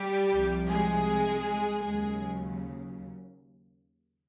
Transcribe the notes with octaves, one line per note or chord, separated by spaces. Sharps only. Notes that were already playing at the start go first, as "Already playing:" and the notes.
Already playing: G3 G4
C2 C3 F3
G#3 G#4
D#2 C#3 F#3 G#3 G#4